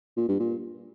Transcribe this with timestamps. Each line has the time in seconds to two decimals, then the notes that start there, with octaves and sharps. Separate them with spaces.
0.17 A#2
0.28 G2
0.40 A#2